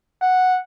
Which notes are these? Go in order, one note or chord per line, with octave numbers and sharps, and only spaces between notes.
F#5